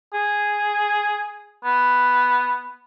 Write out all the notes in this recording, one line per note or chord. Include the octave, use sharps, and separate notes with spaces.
G#4
B3